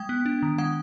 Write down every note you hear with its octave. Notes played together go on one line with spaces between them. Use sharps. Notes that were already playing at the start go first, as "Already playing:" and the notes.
Already playing: G#3 G5
B3
D4
D#3
G#3 F#5